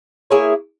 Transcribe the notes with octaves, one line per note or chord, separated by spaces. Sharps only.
A#3 E4 G#4 C#5